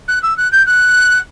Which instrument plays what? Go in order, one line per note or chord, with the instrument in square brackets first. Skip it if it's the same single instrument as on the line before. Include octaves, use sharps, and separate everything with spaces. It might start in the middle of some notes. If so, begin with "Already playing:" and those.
[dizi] F#6
E6
F#6
G6
F#6